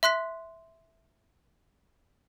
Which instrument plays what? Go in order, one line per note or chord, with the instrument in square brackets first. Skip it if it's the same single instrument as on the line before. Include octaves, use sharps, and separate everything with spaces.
[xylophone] E5 C6 F#6 B6